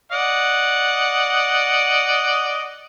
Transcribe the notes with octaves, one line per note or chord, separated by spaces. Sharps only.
D5 D#5 F#5